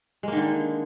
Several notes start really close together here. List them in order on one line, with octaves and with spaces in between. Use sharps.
G#3 A#3 D#3 D3